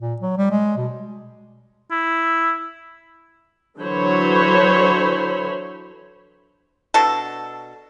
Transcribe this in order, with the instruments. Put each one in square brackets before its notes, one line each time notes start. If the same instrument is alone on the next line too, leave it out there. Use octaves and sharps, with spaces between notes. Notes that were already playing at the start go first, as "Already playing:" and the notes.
[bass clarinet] A#2
F#3
G3
G#3
B2
[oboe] E4
[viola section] D3 E3 F#3 C5 C#5 B5
[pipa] B2 D4 F#4 A4